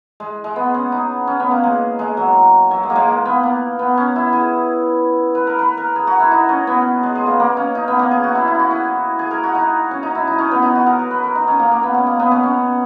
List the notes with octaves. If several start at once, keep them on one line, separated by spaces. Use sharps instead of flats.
G#3
G#3
B3
C#4
D#4
C#4
B3
A#3
G#3
G#3
F#3
F#3
G#3
A#3
G#3
A#3
B3
A#3
B3
C#4
E4
G#4
B4
A#4
B4
A#4
G#4
F#4
E4
D#4
C#4
B3
G#3
G#3
A#3
A#3
C#4
D#4
B3
A#3
G#4
F#4
E4
E4
F#4
G#4
G#4
A#4
F#4
D#4
C#4
D#4
E4
D#4
C#4
B3
D#4
F#4
A#4
B4
B4
A#4
D#4
C#4
A#3
A#3
B3
C#4
A#3
B3
C#4
C#4